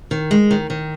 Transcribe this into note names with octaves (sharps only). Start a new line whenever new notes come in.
D#3
G#3
D#3
D#3